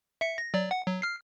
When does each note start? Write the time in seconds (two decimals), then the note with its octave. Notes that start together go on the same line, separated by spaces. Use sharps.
0.21 E5 C#7
0.38 A#6
0.54 F#3 D5
0.71 F#5
0.87 F#3
1.02 F6 C7